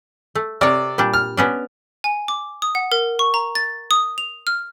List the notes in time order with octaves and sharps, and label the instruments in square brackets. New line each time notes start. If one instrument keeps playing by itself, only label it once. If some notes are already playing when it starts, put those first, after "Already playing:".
[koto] A3
[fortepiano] C3 D5 [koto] A#4 C#5
[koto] A#2 G3 D4
[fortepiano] F6
[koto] B3 C#4 D4
[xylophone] G#5
D6
D#6
F#5
A#4
C#6
A#5
A6
D#6
F7
F6